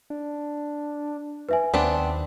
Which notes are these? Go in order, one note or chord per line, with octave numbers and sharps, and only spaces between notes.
D4
B4 E5 G#5
D#2 B3 C4 D4